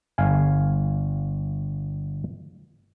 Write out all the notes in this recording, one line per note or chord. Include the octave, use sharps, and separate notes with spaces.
G1 F5 G#5